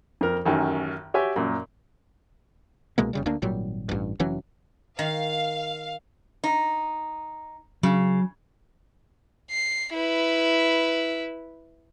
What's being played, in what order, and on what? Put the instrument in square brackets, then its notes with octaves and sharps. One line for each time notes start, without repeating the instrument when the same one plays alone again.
[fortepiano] F2 A#4
A1 F#2 D#3
F#4 G4 C#5 E5 G5 G#5
F#2 A#2
[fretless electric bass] C2 B2 G#3 A#3
F#1 C#3 G3
D2 A#3 D4
G#1 A#2 F#3 G3
A1 G2
F1 E3 F#3 C#4
[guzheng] D#3 [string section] F5
[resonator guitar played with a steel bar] D#4
[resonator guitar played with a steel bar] C#3 [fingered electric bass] F#3
[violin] C7
E4 B4